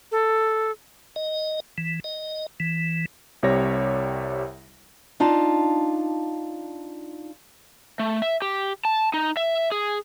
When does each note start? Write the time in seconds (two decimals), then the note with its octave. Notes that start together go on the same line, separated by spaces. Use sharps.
0.11 A4
1.16 D#5
1.78 E3
2.04 D#5
2.60 E3
3.43 C2 C3 G3 C#5 A#6
5.20 D4 D#4 F4 A5
7.99 A3
8.22 E5
8.42 G4
8.85 A5
9.14 D#4
9.37 E5
9.72 G#4